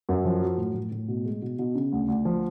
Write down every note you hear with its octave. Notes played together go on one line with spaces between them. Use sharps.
F#2
F3
F#3
A2
A2
A2
B2
G#3
B2
B2
C#3
D2
D2
F3